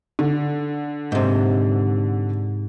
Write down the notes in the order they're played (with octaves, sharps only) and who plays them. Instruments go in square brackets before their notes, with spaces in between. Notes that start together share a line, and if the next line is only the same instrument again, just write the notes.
[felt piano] D3
[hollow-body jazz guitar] G#2 C3